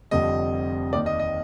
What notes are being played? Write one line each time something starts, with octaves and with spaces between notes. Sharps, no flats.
F1 F2 D3 G3 C4 D#5
D#2 D#3 A#3 D#4 D5
D#5
D#5